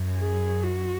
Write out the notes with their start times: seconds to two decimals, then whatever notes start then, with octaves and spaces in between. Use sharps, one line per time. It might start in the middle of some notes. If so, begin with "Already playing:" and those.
Already playing: F#2
0.17 G#4
0.63 F#4